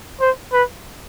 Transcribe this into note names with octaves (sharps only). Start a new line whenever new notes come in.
C5
B4